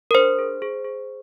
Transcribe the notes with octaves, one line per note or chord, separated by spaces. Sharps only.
A#4
D4 C5
G#4
G#4
G#4